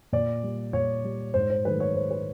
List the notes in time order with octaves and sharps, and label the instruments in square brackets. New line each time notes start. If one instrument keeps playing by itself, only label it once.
[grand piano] A#2 D5
G3
A#2 C#5
G3
G#2 C5
C5
D#3 F#3 A3 B4
C#5
G#2 C5
B4